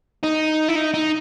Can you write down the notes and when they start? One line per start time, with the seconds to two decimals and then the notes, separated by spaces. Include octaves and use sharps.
0.23 D#4
0.68 E4
0.76 D#4
0.94 D#4